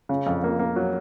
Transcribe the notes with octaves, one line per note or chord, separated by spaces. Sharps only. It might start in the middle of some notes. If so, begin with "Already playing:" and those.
C#3
F2
A#3
A#3
F#3